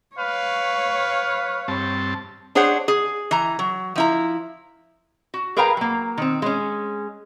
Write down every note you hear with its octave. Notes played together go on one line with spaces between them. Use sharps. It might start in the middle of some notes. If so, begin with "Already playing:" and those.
B4 C#5 F5
G2 C4 A5
D4 G#4 C5 C#5 F#5
G#4
E3 A#5
F#3
F3 E4 A#5
F#4
G#4 A#4 B4 F5 G5 A#5
F#3 A#3
D#3 C4
G#3 C#4